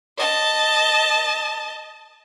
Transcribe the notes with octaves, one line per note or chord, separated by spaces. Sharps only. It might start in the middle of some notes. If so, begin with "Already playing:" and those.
D#5 A5